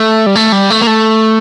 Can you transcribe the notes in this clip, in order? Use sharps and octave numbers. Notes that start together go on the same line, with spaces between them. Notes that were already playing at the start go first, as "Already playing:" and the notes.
Already playing: A3
G3
A3
G3
A3
A#3
A3